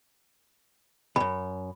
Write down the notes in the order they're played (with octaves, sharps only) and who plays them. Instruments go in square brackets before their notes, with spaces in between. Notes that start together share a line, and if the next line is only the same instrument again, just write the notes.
[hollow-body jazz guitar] C2 F#2 [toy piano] B5